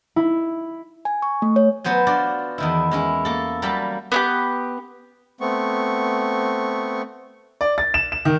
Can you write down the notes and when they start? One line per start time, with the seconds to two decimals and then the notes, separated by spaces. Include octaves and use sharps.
0.16 E4
1.05 G#5
1.22 C#6
1.42 A3
1.56 C#5
1.84 F#3 B3 C5 G#5
2.06 D4 F4 F#4 D5
2.58 E2 D#3 E4
2.91 G#3 C#4 E4
3.25 A#3 A4
3.62 F#3 G3 A#3 F5 A5 B5
4.12 B3 E4 G4
5.41 A3 B3 C4 C#6
7.61 D5
7.78 A6
7.94 E7
8.12 E7
8.25 D#3